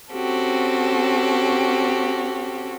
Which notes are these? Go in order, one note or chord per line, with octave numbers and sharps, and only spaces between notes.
C4 C#4 F#4 G4 A4